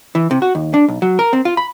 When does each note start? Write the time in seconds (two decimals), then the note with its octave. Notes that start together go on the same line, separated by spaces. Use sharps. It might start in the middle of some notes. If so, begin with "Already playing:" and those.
0.15 E3
0.31 C3
0.42 F#4
0.55 D#2
0.74 D4
0.88 B1
1.02 F#3
1.19 A#4
1.33 C4
1.45 F4
1.57 B5